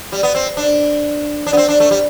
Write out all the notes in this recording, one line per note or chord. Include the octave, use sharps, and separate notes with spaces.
G3
B3
C4
D4
D4
B3
C4
D4
A3
G3